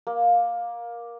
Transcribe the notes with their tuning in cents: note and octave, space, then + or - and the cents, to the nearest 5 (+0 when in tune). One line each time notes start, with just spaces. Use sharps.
A#3 +15